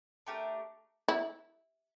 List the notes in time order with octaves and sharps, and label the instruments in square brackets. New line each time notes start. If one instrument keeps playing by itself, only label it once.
[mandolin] A3 D4 G4 A#4
[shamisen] E4